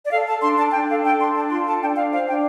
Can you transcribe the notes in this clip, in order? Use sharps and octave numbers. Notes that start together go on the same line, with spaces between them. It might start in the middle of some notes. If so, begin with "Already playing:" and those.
D5
A4 F5
A4 A5
D4 C6
D4 A5
D4 G5
A4 F5
D4 G5
D4 C6
D4 A5
F4 C6
A4 A5
D4 G5
D4 F5
C5 F5
D4 G5